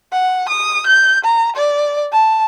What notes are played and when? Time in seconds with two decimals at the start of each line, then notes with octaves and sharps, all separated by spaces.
0.12 F#5
0.49 D#6
0.87 G6
1.24 A#5
1.56 D5
2.12 A5